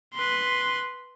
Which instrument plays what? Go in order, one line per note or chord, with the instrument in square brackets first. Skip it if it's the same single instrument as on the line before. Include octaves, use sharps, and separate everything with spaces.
[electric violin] B4 C6